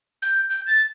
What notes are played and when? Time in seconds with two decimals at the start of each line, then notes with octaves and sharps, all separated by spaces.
0.22 G6
0.50 G6
0.67 A6